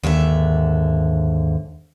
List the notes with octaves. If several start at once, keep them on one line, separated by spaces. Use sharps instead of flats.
D#2 G#2 D3 E5